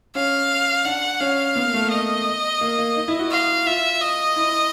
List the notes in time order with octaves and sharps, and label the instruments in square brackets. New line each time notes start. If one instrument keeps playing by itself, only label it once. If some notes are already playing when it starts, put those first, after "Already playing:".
[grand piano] C#4 [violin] F5
[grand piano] D4 [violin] F#5
[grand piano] C#4 [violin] F5
[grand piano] B3
A#3
A3
A#3
[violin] D#5
[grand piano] A#3
A#3
D#4
E4
F#4
[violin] F5
[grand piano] F4 [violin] E5
[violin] D#5
[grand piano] E4